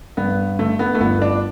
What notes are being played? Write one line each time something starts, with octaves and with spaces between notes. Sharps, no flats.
G2 B3
D3 A3
B3
A3
G1 B3
D4